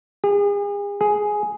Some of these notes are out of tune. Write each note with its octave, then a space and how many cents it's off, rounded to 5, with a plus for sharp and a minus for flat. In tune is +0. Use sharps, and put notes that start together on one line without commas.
G#4 -40
G#4 +5